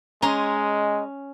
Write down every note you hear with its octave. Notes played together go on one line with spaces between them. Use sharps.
G#3 C#4 D#5 G#5 A#5 C6